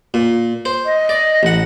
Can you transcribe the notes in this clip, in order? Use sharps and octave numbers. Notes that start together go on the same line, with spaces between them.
A#2
C5
D#5
D5
A1 F#5